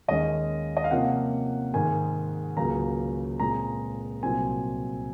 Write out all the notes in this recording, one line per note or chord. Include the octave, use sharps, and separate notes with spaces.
D#2 D#3 G#3 C#4 D#5
D#5
F5
C3 F3 A#3 C#4 F#5
G#2 D#3 G#3 G#5
C#2 C#3 F#3 A#3 C#4 A#5
A#2 G#3 C4 A#5
C2 A#2 F#3 C4 G#5